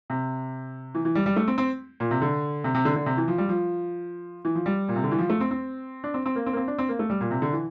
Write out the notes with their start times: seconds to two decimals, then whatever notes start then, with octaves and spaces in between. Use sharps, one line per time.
0.10 C3
0.95 E3
1.05 E3
1.15 G3
1.26 G3
1.36 A3
1.48 C4
1.58 C4
2.00 A#2
2.11 C3
2.22 D3
2.64 C3
2.75 C3
2.85 D3
2.96 D3
3.06 C3
3.17 E3
3.28 F3
3.38 G3
3.49 F3
4.45 E3
4.55 F3
4.66 G3
4.89 A#2
4.96 C3
5.04 D3
5.11 E3
5.18 F3
5.30 A3
5.40 C4
5.51 C4
6.04 D4
6.14 C4
6.26 C4
6.36 A#3
6.46 C4
6.53 A#3
6.57 C4
6.68 D4
6.78 C4
6.89 A#3
6.99 A3
7.10 G3
7.21 A#2
7.31 C3
7.42 D3
7.53 E3